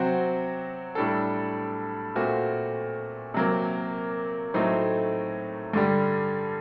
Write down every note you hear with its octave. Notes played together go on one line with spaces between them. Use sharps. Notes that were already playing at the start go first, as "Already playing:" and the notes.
Already playing: C3 F#3 C4 F#4
A2 G3 D4 A4
A#2 A3 C4 F#4
C3 F#3 A#3
A2 F#3 A3 C4 D#4
G2 D3 G3